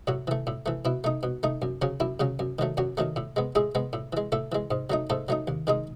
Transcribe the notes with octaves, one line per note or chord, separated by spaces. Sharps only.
A2 F#3 F#4
E3 A3
A2
E3 A3
B2 E4
A3 D#4
B2
A3 D#4
F#2
C#3 F#3 C#4
F#2 E4
C#3 F#3 C#4
F#2
D#3 F#3 A3
F#2 F#3 F#4
D#3 F#3 A3
A2
G#3 B3
A2 G#3 G#4
G#3 B3
A2
E3 G#3
A2 A3 A4
E3 G#3
G#2
F#3 A3 D#4
G#2 A3 A4
F#3 A3 D#4
D#2
D#3 G#3 D#4